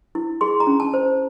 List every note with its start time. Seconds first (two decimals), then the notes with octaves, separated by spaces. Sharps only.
0.15 E4
0.41 G#4 C6
0.60 A#5
0.67 C#4
0.80 A5
0.94 C5